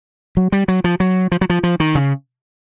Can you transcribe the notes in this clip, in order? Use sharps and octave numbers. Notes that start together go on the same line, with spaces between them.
F#3
G3
F#3
F3
F#3
F3
F#3
F3
F3
D#3
C#3